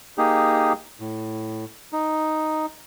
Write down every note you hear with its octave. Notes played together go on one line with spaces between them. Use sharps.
A#3 D#4 G4 G#4
A2
D#4